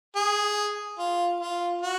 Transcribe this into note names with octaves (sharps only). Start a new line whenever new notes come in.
G#4
F4
F4
F#4